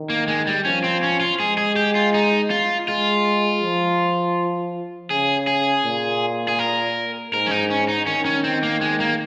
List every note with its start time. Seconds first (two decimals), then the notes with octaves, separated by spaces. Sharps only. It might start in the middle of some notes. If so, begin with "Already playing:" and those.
Already playing: D#3
0.10 A#3
0.28 G#3
0.47 G3
0.65 F3 C#4
0.84 C4
1.03 C#4
1.21 F4
1.40 G#3 G#4
1.58 G#4
1.76 G4
1.95 F4
2.14 D#4
2.50 F4
2.88 G#3 F4
3.62 F3
5.10 C#3 G#4
5.47 G#4
5.85 A#2
6.48 G#4
6.59 A#4
7.33 G#2 A#4
7.46 C#4
7.51 D#4
7.70 C#4
7.88 D#4
8.07 D#3 C#4
8.25 C#4
8.44 C4
8.63 A#3
8.81 G#3
9.00 A#3